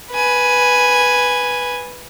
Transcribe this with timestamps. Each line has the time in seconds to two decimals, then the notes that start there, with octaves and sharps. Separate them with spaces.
0.12 B4 G#5